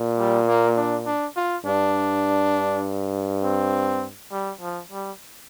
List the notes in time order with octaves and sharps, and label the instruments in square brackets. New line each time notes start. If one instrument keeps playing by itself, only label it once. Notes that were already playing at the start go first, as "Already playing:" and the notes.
Already playing: [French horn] A#2
[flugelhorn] G3
A#3
D4
D4
F4
[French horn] G2 [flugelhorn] D4
[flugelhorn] C4
G3
F3
G3